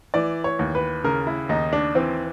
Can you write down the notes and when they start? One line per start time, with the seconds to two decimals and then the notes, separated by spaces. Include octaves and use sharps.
0.14 E3 D5
0.44 C#5
0.59 D#2
0.75 B4
1.04 C#3 A#4
1.27 E4
1.49 D#2 D#4
1.73 D4
1.95 E3 C4